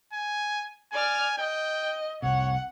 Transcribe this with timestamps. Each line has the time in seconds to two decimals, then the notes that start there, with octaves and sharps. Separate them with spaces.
0.13 G#5
0.92 D5 G#5 F6
1.38 D#5 G5
2.22 F1 C2 C3 C#5 F#5